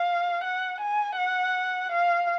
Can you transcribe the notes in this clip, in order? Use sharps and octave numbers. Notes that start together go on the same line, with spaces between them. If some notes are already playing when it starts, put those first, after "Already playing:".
Already playing: F5
F#5
G#5
F#5
F5